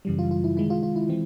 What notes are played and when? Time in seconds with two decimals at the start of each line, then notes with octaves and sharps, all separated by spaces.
0.05 F#2 C#3 E3 G3
0.19 F4
0.31 F4
0.44 E4
0.56 C3 D#3 G#3 E4
0.70 F4
0.83 F4
0.96 E4
1.09 E3 G#3 C4